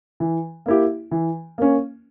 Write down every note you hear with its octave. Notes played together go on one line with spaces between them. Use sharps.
E3
A#3 E4 G4
E3
A#3 C#4